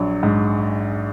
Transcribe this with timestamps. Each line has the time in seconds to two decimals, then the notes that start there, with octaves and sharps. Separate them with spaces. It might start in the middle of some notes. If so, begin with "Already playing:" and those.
Already playing: A#1 F#3
0.23 G#2